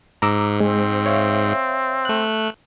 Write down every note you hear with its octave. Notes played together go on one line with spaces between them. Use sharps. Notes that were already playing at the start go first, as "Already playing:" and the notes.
G#2 A#5 D6 E6
G#3 C4
C#5 E5 F5
A3 F#6